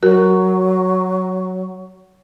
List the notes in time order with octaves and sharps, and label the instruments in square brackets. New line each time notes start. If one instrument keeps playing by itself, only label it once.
[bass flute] F#3 [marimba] F#4 A#4